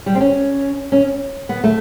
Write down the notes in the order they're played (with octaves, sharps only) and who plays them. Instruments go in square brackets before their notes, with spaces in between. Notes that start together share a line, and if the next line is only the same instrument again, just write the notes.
[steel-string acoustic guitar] G3
C4
C#4
C#4
B3
A3